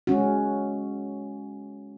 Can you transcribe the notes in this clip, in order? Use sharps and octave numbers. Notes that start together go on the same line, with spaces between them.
G#3 C#4 F#4